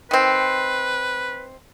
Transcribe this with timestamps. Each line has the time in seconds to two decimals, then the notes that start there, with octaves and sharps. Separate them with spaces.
0.11 D#3 C4 B4